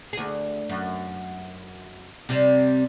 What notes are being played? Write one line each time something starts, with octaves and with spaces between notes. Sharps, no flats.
D2 G#4
F#2
C3 G3